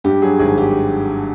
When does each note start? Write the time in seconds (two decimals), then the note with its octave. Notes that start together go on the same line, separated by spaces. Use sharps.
0.04 G2 G4
0.22 F#3 G#4
0.39 G#1 G#4
0.58 G4